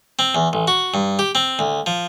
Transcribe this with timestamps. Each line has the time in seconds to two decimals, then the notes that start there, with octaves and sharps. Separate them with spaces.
0.19 C4
0.35 E2
0.53 A1
0.68 F#4
0.94 G2
1.19 G4
1.35 C4
1.59 D2
1.86 F3